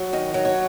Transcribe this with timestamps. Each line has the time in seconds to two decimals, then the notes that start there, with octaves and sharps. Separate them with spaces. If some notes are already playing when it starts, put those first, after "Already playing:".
Already playing: F#3
0.13 D#3 D#5
0.34 F#3
0.45 C#5